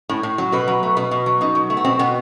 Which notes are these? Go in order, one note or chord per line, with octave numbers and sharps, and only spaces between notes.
A2
A2
F#3
B2 B4
F#3
A3
B2 B4
B2
F#3
B2 D#4
F#3
A3
B3
B2 C4
B2 B3